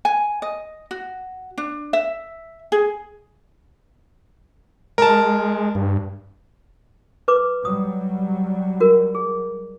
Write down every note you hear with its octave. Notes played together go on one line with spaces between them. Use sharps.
G#5
D#5
F#4
D4
E5
G#4
G#3 A#4 A5
G2
B4 D6
F#3 G3 D#6
F#4 A#4
G#4